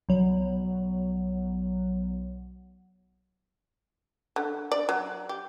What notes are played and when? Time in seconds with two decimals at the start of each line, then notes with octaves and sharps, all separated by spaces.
0.09 B1 F#3
4.36 D3
4.72 D5
4.89 F#3
5.29 G4